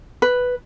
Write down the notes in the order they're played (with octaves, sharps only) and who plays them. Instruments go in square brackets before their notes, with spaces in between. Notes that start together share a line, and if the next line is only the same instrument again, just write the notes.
[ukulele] B4